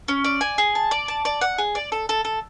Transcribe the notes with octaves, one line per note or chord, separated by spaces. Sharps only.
C#4
D5
G#5
G#4
A5
D5
A5
D5
F#5
G#4
D5
A4
A4
A4